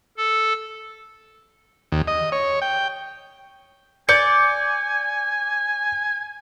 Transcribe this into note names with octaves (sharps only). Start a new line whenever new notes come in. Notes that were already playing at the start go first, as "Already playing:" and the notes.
A4
D#2
D#5
C#5
G5
D5 G#5 G6 C#7